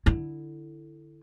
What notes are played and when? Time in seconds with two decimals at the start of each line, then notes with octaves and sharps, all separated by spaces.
0.06 D3 E4